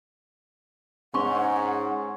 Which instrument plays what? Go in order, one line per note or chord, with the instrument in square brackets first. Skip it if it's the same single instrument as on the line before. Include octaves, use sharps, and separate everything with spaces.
[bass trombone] G#2 [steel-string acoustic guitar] C#4 [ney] F#5 [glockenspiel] C6 C#6